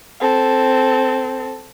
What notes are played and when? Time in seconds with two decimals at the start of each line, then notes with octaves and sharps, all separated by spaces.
0.21 C4 A4